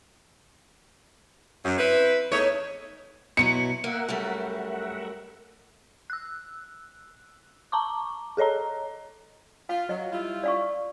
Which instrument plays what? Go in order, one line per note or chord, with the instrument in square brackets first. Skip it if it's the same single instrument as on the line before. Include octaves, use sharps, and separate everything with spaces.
[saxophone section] F#2
C4 E4 B4
[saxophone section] E2 A3 D#4 [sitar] C#5
[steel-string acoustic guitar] B2 F#3 E4 [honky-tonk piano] C#7
[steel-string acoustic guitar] A#3 [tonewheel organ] A#4 E5 F#5
[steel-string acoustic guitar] F#2 G3 A3
[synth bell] E6 F#6
A5 A#5 C#6 D6
G#4 A4 C#5 D#5 A#5
[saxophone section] F4 [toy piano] F5
[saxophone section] F#3 [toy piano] D#5
[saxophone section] G3 E4 F4
[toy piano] D5 F5 C#6